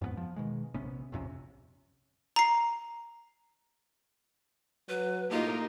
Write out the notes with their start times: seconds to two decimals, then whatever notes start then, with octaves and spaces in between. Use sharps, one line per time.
0.01 F2 G#2 A3 B3
0.17 F3
0.36 B2 D#3 G#3
0.74 A#1 C3 B3 C#4
1.12 A#1 F2 C3 C#4
2.36 A#5 C7
4.89 F#3 B4
5.31 A2 A#3 D#4 F4 G4 A#4